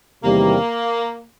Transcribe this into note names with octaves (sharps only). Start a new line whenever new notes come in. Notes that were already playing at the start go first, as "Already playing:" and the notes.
E2 C3 D#3 G3 A#3